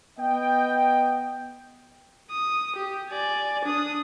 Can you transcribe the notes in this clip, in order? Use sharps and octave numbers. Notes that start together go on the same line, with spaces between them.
B3 D#5 G5
D#6
G4
D5 G#5
D4 D#6